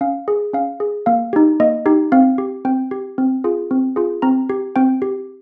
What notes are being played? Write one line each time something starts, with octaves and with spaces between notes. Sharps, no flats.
C#4 F5
G#4
C#4 F5
G#4
A#3 F5
D#4 G4
A#3 D#5
D#4 G4
C4 F5
G4
C4 G5
G4
C4
F4 G#4
C4
F4 G#4
C4 A#5
G4
C4 G5
G4